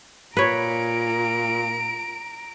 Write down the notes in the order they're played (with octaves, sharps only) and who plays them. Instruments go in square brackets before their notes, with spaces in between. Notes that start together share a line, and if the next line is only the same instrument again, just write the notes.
[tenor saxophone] A#2 [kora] B4 C#5 [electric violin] A#5 D7